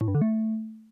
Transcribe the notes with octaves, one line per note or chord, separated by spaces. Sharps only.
A2
G2
D3
A3